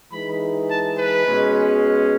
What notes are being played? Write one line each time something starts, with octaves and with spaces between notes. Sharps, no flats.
E3 G#3 D#4 B5
A5
B4
B2 G#3 C#4